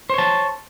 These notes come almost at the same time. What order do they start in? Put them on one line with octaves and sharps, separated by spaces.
C5 C#5 A5